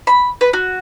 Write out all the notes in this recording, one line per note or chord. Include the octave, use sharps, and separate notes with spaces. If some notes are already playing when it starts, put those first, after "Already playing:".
B5
B4
F#4